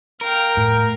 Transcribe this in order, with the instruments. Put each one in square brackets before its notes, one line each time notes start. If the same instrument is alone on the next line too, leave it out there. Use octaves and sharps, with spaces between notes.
[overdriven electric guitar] A#4 [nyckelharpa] F5 G5
[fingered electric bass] A2